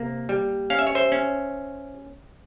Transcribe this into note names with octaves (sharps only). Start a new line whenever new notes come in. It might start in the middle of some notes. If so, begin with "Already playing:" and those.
Already playing: C3 A#3
G3
C#4 F5
E5
C#5
C5 E5
C#4